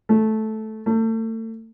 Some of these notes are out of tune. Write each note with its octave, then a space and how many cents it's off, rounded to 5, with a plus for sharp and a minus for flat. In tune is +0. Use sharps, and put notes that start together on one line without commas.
A3 -10
A3 +35